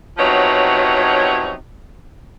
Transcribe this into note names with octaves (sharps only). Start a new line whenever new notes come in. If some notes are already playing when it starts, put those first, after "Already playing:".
C3 F3 F#3 B3 D#4 C#5